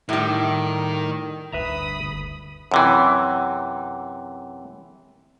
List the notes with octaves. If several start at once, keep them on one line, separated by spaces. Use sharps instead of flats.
A2 D#3 G3
F#1 D2 G2 B4 E5 A#5 B5 D#6
F#2 C3 E3